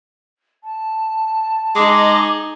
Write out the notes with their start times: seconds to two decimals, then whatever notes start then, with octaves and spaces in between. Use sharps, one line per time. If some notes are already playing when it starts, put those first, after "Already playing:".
0.64 A5
1.76 G#3 D#4 G#4 D6